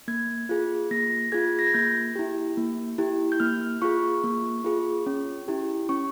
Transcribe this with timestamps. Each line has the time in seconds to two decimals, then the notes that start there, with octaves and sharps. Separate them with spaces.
0.08 A#3 G#6
0.49 F4 G#4
0.91 A#3 A#6
1.32 F4 G#4 G#6
1.59 A#6
1.67 G#6
1.74 A#3 G6
2.16 E4 G4
2.57 A#3
2.98 E4 G4
3.32 G6
3.40 A#3 F6
3.82 F4 G#4 C#6
4.24 A#3
4.64 F4 G#4
5.06 C#4
5.48 E4 G4
5.89 C#4 C#6